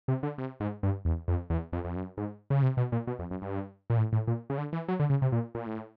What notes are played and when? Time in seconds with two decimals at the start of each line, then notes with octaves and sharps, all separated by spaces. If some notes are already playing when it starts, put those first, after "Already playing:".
0.08 C3
0.23 D3
0.38 C3
0.60 G#2
0.83 G2
1.05 E2
1.28 F2
1.50 E2
1.73 F2
1.85 F2
1.96 F#2
2.17 G#2
2.50 C#3
2.62 C3
2.77 B2
2.92 A#2
3.07 B2
3.19 F2
3.31 F#2
3.42 G2
3.90 A#2
3.97 A2
4.13 A2
4.27 A#2
4.50 C#3
4.58 D3
4.73 E3
4.88 F#3
5.00 D3
5.10 C#3
5.22 C3
5.32 A#2
5.55 A#2
5.66 A2